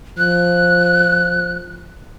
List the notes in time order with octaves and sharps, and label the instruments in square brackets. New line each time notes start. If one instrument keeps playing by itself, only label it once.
[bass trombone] F3 [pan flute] F#6